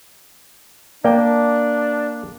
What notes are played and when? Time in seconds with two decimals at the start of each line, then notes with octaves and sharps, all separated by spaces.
1.05 A#3 D4 D5 G5